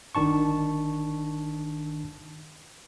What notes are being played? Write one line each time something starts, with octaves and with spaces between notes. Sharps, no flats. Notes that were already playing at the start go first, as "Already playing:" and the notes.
G1 D#3 D4 A5 C#6